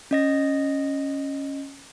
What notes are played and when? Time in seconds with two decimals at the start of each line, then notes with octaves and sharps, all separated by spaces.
0.11 C#4 D#5 A#6